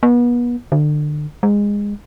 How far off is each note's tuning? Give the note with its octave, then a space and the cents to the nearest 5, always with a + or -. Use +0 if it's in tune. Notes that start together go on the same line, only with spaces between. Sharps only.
B3 -35
D3 +30
G#3 -20